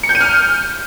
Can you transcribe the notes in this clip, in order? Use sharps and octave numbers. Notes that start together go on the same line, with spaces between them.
C#7
G6
D#7
F6